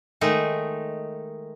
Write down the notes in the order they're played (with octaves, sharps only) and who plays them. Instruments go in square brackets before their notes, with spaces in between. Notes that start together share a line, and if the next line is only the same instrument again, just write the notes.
[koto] D#3 G#3 A3 D#4